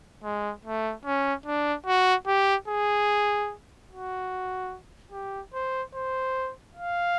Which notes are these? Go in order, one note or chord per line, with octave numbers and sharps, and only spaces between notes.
G#3
A3
C#4
D4
F#4
G4
G#4
F#4
G4
C5
C5
F5